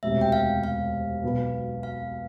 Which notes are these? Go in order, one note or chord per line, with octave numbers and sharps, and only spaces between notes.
E1 D2 C3 E5
G5
F5
F5
B1 B2 B3
F5